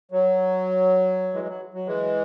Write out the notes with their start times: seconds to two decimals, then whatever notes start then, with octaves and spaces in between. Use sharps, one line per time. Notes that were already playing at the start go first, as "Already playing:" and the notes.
0.12 F#3
1.34 E3 G#3
1.47 F#3
1.74 F#3
1.86 E3 G#3